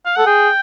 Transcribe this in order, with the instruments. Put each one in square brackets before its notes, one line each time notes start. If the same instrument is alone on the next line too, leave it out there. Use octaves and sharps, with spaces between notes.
[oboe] F5
[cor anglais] A4 [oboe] F#5
[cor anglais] G#4 [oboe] G5